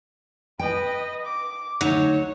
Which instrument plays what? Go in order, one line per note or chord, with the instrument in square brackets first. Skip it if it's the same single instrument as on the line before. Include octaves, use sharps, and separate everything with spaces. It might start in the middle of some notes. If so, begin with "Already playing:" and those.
[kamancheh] B4 D#5 [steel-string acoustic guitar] G5
[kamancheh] D6
[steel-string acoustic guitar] D2 D#4 [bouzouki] F#3 [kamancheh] C#5